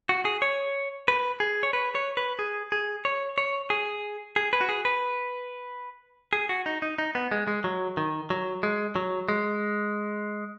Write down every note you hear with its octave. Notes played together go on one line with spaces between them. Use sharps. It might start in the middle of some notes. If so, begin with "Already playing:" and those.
F#4
G#4
C#5
B4
G#4
C#5
B4
C#5
B4
G#4
G#4
C#5
C#5
G#4
G#4
B4
F#4
G#4
B4
G#4
F#4
D#4
D#4
D#4
B3
G#3
G#3
F#3
D#3
F#3
G#3
F#3
G#3